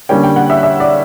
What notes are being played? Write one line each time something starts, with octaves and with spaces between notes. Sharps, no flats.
D3 G3 A#3 C#4 G5
G5
F#5
E5
E5
D5